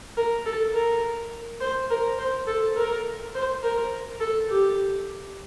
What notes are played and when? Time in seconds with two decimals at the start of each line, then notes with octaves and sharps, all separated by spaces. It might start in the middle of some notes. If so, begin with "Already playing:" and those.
0.17 A#4
0.46 A4
0.74 A#4
1.61 C5
1.90 A#4
2.19 C5
2.47 A4
2.77 A#4
3.35 C5
3.63 A#4
4.20 A4
4.49 G4